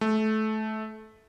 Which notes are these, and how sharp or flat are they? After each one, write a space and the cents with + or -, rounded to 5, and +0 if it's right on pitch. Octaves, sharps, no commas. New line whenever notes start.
A3 -20